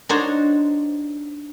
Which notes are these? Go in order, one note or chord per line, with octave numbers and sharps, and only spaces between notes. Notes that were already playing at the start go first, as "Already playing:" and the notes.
D4 D#4 F#4 C5 C#5